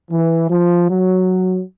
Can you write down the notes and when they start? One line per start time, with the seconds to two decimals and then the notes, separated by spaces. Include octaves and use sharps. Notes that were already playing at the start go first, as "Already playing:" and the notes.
0.11 E3
0.51 F3
0.90 F#3